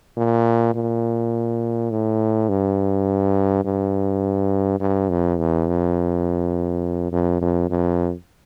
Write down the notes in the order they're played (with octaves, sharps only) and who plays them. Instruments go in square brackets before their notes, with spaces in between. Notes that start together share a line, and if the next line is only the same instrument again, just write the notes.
[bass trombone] A#2
A#2
A2
G2
G2
G2
F2
E2
F2
F2
F2
F2